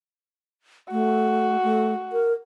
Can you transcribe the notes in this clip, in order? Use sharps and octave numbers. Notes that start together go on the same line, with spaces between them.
A3 F#4
A3
A#4